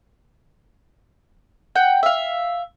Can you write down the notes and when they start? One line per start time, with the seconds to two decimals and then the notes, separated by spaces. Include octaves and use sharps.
1.75 F#5 G5
2.03 E5 F5